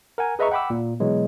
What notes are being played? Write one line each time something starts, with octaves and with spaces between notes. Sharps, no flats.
A#4 F#5 G#5
G#4 B4 D#5 E5 A#5 C#6
F#5 G5 B5 D6 E6
A#2
B2 E3 F#3 G#3